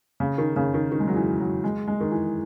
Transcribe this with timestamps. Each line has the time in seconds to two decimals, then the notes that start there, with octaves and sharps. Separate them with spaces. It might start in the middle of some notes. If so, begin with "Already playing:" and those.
0.20 C#3
0.38 D#3
0.56 C#3
0.74 D#3
0.92 D#3
1.00 G#3
1.08 F#3
1.16 E3
1.40 F#3
1.64 G#3
1.87 G#3
2.00 D#3
2.12 E3